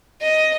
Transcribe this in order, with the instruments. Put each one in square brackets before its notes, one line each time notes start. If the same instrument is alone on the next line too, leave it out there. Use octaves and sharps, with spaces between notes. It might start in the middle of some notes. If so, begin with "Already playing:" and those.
[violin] D#5